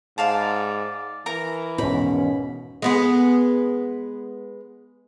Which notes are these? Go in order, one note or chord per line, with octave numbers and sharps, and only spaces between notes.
G#2 D5 F5 A5
E3 A#4 A#5
E1 G#2 B2 D#3 C#4 B5
G#3 B3 G#4